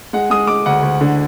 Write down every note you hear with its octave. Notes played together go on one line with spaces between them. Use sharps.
G#3 F#5
G#3 D#6
G#3 D6
D2 F#5
D2
D3